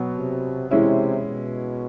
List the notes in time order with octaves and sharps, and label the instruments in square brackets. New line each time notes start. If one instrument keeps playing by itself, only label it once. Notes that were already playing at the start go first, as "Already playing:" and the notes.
Already playing: [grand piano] B2 F#3 B3
[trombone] C3
[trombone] C3 [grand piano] E3 G#3 C#4 E4
[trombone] B2